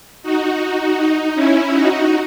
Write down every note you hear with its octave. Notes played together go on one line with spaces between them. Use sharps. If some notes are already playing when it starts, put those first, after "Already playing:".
D#4 F#4
D#4
C#4 E4
D#4 F#4